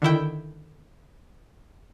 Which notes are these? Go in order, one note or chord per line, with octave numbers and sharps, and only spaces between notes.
D3 D#3 E4 G5